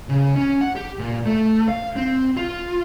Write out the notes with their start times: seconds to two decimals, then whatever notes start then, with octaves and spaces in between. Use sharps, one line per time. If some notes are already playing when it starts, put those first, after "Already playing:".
0.09 C#3
0.36 C#4
0.61 F#5
0.76 G4
0.99 A#2
1.26 A3
1.69 F5
1.96 C4
2.37 F4